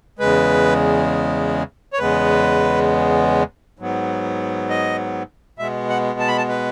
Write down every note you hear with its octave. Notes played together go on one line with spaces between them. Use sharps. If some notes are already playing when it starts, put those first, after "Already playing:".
E2 C#3 G#3 B4
C#5
E2 C#3 G#3 B3 B4
G#2 F#3 B3
D#5
B2 G#3 B3 E5
F#5
A5
B5
A5
B4